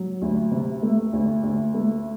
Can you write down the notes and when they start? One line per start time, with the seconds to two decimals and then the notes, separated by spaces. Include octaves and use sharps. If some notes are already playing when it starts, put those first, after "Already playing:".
Already playing: F#3
0.22 D2
0.52 C3
0.83 A3
1.13 D2
1.43 D2
1.74 A3